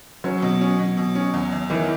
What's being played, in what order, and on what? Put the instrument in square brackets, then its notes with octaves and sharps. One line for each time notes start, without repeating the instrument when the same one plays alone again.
[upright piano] F#3 [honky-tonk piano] C#4
[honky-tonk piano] B2
C#4
B2
B2
C#4
E2
E2
[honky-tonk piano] D#3 [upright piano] E3